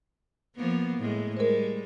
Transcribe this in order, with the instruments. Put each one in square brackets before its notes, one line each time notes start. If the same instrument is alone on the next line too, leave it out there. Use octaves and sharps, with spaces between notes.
[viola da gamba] F3 A#3 B3
A2 G#3
[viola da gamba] G3 G#3 [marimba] A#4 C5